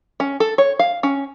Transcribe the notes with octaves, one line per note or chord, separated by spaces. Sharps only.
C#4
A4
C#5
F5
C#4